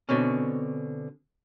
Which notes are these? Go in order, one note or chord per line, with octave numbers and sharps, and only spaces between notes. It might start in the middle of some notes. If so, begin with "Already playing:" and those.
B2 D3 C4 C#4